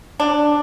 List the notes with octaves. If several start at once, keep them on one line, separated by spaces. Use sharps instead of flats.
D4